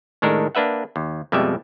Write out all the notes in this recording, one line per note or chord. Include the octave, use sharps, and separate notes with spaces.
A2 D#3 G#3 D4 A4 A#4
A#3 D4 B4 E5 F#5
D#2
F2 B2 G3 G#3 D5 E5